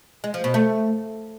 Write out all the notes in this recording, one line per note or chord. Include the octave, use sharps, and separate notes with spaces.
G#3
F3
B2
A3